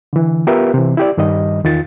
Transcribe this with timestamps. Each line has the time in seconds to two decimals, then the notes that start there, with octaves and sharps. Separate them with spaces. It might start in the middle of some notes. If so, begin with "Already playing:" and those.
0.13 D3 E3
0.47 B3 F4 G4 A#4 B4 E5
0.74 C3 E3
0.97 E4 G4 D5
1.18 G2 D#3 G3 D#5
1.64 E2 D#3 F4 A6